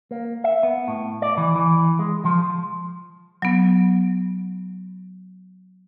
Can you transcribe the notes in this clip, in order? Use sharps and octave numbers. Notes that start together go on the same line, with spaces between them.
A#3
E5
B3
A2
D5
E3
E3
G#3
F3
F#3 B3